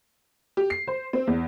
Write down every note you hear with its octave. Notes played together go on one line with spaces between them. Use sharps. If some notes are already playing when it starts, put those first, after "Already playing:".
G4
C7
C5
C4
E2